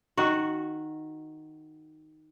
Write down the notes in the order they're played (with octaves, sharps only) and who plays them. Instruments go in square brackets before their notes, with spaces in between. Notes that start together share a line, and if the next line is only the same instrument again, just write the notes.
[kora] D#3 F#4